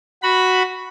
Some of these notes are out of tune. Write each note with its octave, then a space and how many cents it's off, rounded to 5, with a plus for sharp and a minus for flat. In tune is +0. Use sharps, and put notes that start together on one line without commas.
F#4 +0 B5 +0